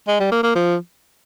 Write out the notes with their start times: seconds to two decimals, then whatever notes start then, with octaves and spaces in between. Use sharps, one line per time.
0.08 G#3
0.20 G3
0.31 A#3
0.43 A#3
0.55 F3